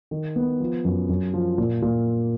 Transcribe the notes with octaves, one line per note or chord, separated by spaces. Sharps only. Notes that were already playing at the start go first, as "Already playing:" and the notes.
D#3
B3
F3
F#2
F#2
F3
A#2
A#2